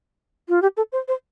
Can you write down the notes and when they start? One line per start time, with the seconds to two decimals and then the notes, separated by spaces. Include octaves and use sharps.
0.49 F4
0.62 G4
0.77 A4
0.92 C5
1.08 C5